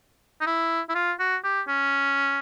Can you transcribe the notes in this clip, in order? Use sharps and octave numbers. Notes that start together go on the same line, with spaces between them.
D#4
E4
E4
F4
F#4
G4
C#4